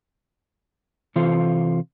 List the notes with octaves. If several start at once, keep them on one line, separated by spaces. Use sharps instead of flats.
C3 E3 F4 A4 C5 F5